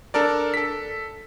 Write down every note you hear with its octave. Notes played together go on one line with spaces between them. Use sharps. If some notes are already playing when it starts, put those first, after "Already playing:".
D4 A4 A#4 D5
A4 B6